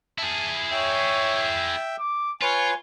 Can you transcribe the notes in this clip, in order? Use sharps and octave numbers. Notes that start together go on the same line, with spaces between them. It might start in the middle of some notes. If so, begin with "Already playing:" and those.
E4 G#4 A5
C#5 E5 G5
D6
F4 B4 C#5 G#5 C#6